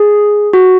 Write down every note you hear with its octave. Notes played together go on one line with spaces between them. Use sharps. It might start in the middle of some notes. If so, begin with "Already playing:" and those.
Already playing: G#4
F#4